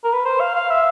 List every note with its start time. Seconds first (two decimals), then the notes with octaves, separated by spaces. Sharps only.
0.04 A#4
0.13 B4
0.25 C5
0.40 F5
0.55 F5
0.70 E5